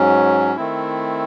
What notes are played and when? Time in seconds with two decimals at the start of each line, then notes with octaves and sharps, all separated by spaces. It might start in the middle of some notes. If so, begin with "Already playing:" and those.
Already playing: G#2 F#3 C#4
0.57 D#3 A3 C4 E4